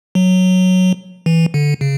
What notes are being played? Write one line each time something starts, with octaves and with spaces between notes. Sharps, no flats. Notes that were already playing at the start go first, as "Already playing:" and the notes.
F#3
E3
D3
C#3